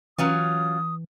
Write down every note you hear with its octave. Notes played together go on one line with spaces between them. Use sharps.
E3 F#3 C#4 F4 D#6